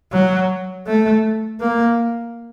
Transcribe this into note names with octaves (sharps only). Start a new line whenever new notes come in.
F#3
A3
A#3